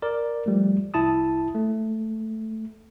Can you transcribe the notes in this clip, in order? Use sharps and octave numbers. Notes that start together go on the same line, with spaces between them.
A#4 D5
F3 G3 A3
C2 E4 A5 D#6
A3